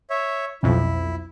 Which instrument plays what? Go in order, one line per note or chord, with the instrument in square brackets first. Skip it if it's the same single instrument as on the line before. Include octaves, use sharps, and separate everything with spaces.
[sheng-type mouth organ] C#5 E5
[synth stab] B1 F2 [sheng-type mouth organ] E4